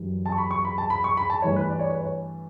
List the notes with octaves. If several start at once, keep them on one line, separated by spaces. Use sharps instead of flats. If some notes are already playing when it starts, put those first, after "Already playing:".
Already playing: F#2 E3 G3
A5
C#6
B5
C#6
B5
A5
B5
C#6
B5
A5
G2 E3 A3 C#5
B4
D5
C#5
B4
C#5